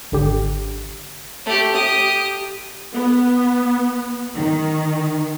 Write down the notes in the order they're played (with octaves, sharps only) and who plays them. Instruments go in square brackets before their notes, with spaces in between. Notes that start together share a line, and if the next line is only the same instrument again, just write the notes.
[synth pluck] G#1 D3 G4
[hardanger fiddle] A3 G4
G4 D#6
[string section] B3
D#3